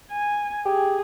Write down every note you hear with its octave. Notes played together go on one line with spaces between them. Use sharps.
G#5
G4 G#4